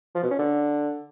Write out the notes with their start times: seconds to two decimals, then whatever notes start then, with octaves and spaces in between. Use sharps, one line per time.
0.15 F3
0.23 B2
0.31 C#4
0.39 D3